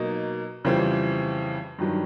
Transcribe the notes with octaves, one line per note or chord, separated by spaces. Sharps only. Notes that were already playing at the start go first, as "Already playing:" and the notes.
Already playing: B2 F#3 A#3 D#4
F2 C#3 E3 G3 C4
G2 D#3 F#3